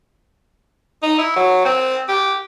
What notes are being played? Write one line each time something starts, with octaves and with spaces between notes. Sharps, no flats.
D#4
E4
F#3
C4
G4